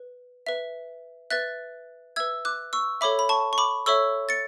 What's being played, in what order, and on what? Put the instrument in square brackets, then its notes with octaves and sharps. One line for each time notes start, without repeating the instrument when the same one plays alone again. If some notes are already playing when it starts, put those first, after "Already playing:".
Already playing: [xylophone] B4
B4 E5
B4 E5 F#6 A6
B4 E5 E6 G#6
D6 F#6
C#6 E6
A4 C#5 E5 B5 D6
B5
A5 C#6
C#6
B5 D6
A4 C#5 E5 C#6 E6
A6 C#7